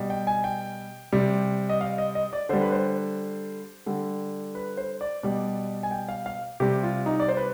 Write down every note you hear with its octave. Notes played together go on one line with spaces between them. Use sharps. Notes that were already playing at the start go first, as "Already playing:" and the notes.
Already playing: B2 G3
G5
G#5
G5
C3 G3
D#5
F5
D#5
D#5
D5
D3 G3 C5
B4
C5
D3 G3
B4
C5
D5
B2 G3 D5
G#5
G5
F5
F5
C3 G3 G4
F4
D#4
D5
C5
B4